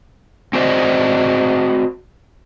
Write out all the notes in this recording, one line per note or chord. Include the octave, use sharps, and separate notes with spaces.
C4 F#4 C5 D5 D#5